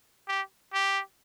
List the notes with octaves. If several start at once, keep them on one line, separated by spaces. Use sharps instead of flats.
G4
G4